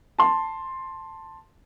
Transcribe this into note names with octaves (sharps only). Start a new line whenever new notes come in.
A5 C6